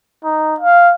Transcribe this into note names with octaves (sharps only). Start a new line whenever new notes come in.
D#4
F5